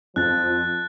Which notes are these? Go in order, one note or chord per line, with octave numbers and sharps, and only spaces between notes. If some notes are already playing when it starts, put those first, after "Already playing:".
F2 F3 F#6 A6